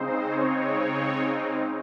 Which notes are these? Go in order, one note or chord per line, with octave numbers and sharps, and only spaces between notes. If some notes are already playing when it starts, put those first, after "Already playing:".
Already playing: C#3 G#3 C4 D#4 C5
C#5